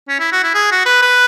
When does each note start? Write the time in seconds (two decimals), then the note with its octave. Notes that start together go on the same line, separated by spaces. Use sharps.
0.09 C#4
0.20 E4
0.32 F#4
0.43 E4
0.54 G#4
0.71 F#4
0.85 B4
1.02 B4